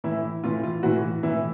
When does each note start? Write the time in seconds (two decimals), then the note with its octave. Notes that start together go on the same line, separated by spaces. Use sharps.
0.04 A2 E3 E4
0.44 A2 E3 F4
0.63 F4
0.83 A2 E3 F#4
1.23 A2 E3 E4